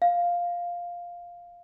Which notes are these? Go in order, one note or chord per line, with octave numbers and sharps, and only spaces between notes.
F5